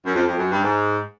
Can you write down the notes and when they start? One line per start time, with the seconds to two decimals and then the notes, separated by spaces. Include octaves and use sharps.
0.06 F#2
0.15 F2
0.27 F2
0.38 F#2
0.51 G2
0.63 G#2